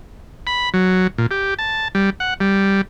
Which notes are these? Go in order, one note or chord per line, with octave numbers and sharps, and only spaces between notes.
B5
F#3
A#2
G4
A5
G3
F#5
G3